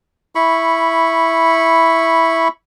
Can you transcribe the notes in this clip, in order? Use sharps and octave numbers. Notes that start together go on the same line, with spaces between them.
E4 B5 C#6